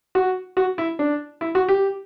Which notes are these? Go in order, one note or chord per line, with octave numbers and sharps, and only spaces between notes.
F#4
F#4
E4
D4
E4
F#4
G4